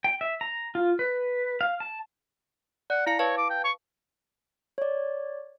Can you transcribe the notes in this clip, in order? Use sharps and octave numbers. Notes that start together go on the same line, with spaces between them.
G5
E5
A#5
F4
B4
F5
A5
D5 F#5
E4 F5 A#5 C#7
B4 C#5 F5 A5
D6
G5
C#6
C#5 D5